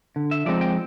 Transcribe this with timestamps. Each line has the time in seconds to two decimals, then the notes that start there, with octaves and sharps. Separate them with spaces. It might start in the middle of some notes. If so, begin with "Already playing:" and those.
0.16 D3
0.31 E5
0.46 F3 G#3 C4 D#4 D5
0.61 G5